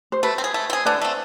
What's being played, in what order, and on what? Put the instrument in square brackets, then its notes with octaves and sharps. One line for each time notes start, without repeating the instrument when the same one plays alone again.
[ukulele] C5
[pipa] A3 [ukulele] B4
[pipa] C4
G#4
A3
C4 G#4
[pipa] D3 [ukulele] B4 D5
[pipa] A3 C4